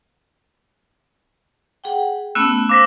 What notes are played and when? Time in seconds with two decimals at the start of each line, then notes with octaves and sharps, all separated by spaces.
1.84 G#4 F#5 G5
2.35 A3 B3 C#4 E6 F#6 E7
2.69 C5 F5 D6 A#6 B6